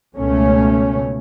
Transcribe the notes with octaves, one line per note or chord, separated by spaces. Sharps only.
C#2 B2 A3 C#4